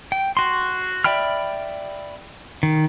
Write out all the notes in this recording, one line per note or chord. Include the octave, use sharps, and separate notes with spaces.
G5
F#4 C6
D5 E5 G5 B5 F6
D#3